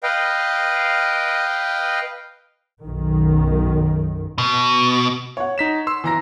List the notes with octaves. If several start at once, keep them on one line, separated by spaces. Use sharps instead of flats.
B4 D#5 F5 G5
B1 F#2 D#3
B2
C#5 F#5
D#4 B6 E7
C6 E6
E3 A#5 A#6